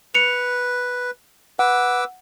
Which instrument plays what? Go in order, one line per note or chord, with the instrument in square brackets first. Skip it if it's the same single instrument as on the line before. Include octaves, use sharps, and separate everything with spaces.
[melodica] B4 [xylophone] C#7 F7
[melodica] B4 D6 E6 [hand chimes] F#5